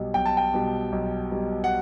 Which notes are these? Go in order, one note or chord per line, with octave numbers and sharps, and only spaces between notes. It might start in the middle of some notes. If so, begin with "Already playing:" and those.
Already playing: B1 B2 G3
B1 G5
A5
G5
B2 G3
B1
B2 G3
F#5